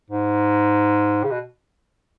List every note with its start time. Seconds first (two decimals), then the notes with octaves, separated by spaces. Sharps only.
0.10 G#2
1.24 C#3
1.31 B2